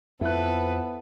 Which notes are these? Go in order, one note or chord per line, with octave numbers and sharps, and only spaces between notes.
F2 B3 E4 A4 B4 F#6